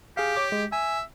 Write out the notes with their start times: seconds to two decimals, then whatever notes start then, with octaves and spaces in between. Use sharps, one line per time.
0.17 G4 G#4 F5
0.36 C#5 D6
0.52 G#3
0.72 E5 G#5